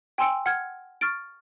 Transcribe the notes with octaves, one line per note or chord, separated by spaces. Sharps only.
G5 G#5 C6 E6 C#7 D7
F#5 F6 G#6
C#6 F6 A6 D7